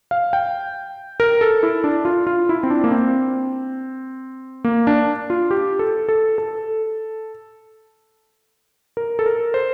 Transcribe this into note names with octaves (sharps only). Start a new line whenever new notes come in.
F5
G5
A#4
A4
E4
D4
F4
F4
E4
C4
D4
A#3
C4
A#3
D4
F4
G4
A4
A4
A4
A#4
A4
A#4
C5